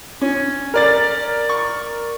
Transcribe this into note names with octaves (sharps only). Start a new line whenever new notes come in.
C#4
A#4 D5 A6
C#6